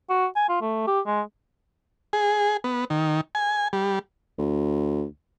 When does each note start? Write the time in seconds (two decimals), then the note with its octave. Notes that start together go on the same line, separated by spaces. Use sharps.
0.09 F#4
0.36 G#5
0.49 F4
0.61 A3
0.87 G4
1.06 G#3
2.13 G#4
2.64 B3
2.90 D#3
3.35 G#5
3.73 G3
4.39 D2